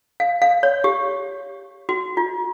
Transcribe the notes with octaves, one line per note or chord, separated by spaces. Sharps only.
F5
F5
C#5
G4
F#4
F4